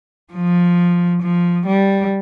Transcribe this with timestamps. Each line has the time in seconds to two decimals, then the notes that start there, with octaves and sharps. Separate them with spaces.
0.33 F3
1.22 F3
1.66 G3